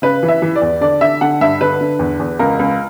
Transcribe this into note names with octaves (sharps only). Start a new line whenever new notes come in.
C#3 B4
E3
E5
E3
D5
E2
D3 D5
D3 E5
D3 F#5
G2 E5
D3 B4
D3
E2
E2
C#2 A#4
C#2